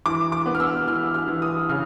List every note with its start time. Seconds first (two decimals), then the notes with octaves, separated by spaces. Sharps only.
0.06 E3 D6
0.32 D6
0.46 B3
0.55 F6
0.60 E6
0.87 E3 F6
1.14 F6
1.28 E3
1.42 D#6
1.69 C#3 F6